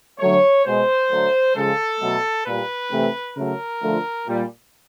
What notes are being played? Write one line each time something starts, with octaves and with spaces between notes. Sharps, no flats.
D3 F#3 A3 C#5
B2 G#3 C5
D3 F#3 A3
C#3 F3 G#3 A4
B2 F#3 A3
A#2 G3 B4
C3 E3 A3
C#3 F#3 A3 A#4
D3 F3 A3
A#2 G3